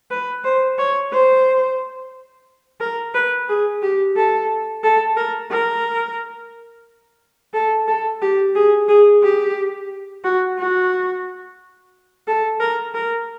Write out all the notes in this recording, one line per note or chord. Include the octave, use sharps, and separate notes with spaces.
B4
C5
C#5
C5
A#4
B4
G#4
G4
A4
A4
A#4
A#4
A4
A4
G4
G#4
G#4
G4
F#4
F#4
A4
A#4
A#4